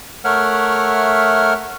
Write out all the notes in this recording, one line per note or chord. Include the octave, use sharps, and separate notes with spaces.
A3 A#4 C#5 E5 F#5 F6